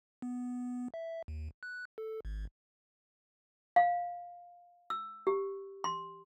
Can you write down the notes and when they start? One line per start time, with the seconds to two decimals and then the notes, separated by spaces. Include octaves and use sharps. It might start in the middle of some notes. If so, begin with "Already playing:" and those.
0.22 B3
0.94 E5
1.28 D#2
1.63 F#6
1.98 A4
2.25 G#1
3.76 F5
4.90 E6
5.27 G4
5.84 C6